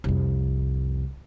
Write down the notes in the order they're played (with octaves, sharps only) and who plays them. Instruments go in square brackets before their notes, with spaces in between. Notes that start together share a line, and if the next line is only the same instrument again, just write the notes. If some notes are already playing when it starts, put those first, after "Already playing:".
[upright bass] C2 F2